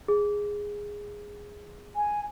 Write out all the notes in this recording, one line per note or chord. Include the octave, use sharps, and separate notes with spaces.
G#4
G#5